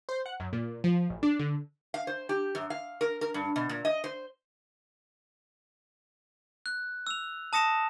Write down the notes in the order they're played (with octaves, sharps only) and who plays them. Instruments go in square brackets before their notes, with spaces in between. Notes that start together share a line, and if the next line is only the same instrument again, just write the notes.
[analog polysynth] C5
F#5
F#2
A#2
F3
A1
D4
D3
[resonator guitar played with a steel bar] F5
C5
G4
F#2
F5
A#4
A#4
G2
B2
A#2
D#5
C5
[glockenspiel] F#6
E6 F7
A5 D#6 A#6 C#7 E7